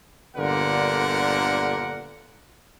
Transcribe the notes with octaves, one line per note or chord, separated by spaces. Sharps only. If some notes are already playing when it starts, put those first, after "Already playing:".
G1 A#2 D3 A#4 F#5